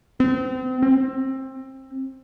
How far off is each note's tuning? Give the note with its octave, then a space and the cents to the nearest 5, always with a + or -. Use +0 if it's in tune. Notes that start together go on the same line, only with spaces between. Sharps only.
C4 -35
C4 +20